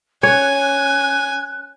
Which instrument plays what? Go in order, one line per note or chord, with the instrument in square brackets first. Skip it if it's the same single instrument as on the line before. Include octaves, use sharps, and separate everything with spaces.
[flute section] C#4 F#6 [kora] C#5 [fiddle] G#5